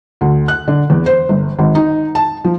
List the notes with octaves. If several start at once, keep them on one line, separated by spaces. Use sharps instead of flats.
D2
F#6
D3
E2
C5
G1
G#1
D#4
A5
F3